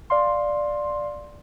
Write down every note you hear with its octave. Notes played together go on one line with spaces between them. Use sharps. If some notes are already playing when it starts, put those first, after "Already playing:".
D5 F5 C6